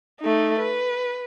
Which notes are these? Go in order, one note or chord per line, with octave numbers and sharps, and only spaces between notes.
A3 D#4
B4